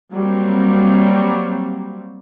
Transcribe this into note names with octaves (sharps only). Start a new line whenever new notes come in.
F#3 G3 A#3 C4